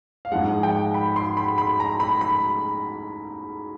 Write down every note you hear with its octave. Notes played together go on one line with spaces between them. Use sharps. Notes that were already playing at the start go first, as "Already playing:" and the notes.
F5
G#2 F3 G#3 F#5
G5
B5
C6
B5
B5
A#5
B5
B5